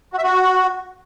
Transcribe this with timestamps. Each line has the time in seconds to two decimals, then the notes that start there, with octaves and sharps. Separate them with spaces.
0.13 F#4
0.18 E5
0.23 F#4